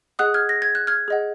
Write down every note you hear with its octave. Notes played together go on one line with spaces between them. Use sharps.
G#4 D#5 F#5 D#6 F#6
F6 G#6
A#6
G#6
F#6
F6 G#6
G#4 D#5 F#5